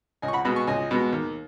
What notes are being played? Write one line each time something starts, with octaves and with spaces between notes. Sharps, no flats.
C#2 D#5 G#5
C#6
F#5 B5
B2 G#3 B3 B5 D#6
G#5 C#6
C#2 D#5 G#5
B2 G#3 B3
D#2